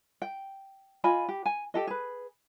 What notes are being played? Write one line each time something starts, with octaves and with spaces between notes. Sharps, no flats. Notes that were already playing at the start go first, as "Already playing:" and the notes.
G5
F4 D#5 G#5 B5
G4
G#5
G4 A4 D#5
G#4 B4